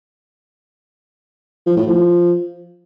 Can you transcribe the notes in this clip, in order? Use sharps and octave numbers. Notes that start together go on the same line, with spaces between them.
F3
A2
F3